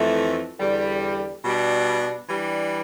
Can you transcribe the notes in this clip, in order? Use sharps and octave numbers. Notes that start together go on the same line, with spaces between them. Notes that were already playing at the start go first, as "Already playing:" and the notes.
Already playing: F2 E3 A3
E2 D3 G3
B2 G3 D4
E3 G3 D4